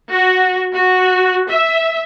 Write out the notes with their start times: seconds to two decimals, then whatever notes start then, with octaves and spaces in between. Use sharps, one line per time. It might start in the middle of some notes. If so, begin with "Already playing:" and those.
0.10 F#4
0.73 F#4
1.48 E5